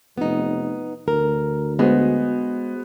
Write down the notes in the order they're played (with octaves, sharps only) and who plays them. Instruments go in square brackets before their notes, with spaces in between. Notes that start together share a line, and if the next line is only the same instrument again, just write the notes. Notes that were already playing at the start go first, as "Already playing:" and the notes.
[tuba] F1 [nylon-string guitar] B3 D#4
[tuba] D2 [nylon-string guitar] A#4
[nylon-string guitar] G#3 [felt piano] B3 F#4 C5